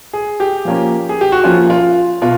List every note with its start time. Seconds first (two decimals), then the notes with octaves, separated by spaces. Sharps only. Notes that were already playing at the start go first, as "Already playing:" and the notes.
0.13 G#4
0.40 G4
0.65 F3 A#3 C#4
1.09 G#4
1.21 G4
1.32 F#4
1.44 F3 A#3 C#4 F4
1.70 F4
2.22 B2 F4